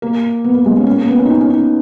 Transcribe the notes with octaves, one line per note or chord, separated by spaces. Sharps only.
A#3
B3
A#3
G#3
C#4
C#4
A#3
B3
C#4
D#4
C#4
C#4
D#4